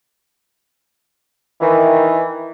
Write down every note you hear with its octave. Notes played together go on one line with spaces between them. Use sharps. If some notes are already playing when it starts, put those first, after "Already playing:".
D#3 E3